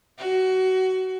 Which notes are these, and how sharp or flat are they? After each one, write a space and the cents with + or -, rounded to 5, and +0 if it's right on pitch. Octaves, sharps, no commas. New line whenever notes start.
F#4 +20